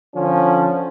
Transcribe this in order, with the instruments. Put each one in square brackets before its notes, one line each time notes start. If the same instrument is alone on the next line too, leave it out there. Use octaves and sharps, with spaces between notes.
[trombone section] D3 F3 C#4